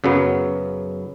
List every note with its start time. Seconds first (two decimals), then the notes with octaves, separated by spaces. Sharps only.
0.04 F#2 C#3 F#3 B3